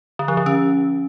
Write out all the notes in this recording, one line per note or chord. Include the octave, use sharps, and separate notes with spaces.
D3
F3
D3
C#4